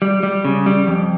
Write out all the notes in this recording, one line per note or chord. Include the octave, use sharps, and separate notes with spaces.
G3
G3
C#3
G3
F2